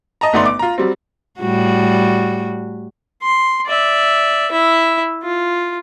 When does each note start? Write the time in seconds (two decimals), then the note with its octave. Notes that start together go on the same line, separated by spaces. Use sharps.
0.21 D#5 A5 A#5
0.33 G1 A3 B3 D#4 D5 C6
0.46 D6
0.59 F4 A#5
0.78 F#3 G3 C4
1.40 A2 G3 F#4
3.23 C6
3.67 D5 E5
4.52 E4 E5
5.23 F4